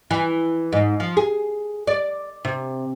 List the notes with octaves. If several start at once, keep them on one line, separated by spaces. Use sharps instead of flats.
E3
G#2
F3
G#4
D5
C3